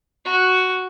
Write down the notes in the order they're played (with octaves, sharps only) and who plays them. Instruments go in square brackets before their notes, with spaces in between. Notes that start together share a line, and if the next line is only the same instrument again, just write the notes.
[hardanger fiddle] F#4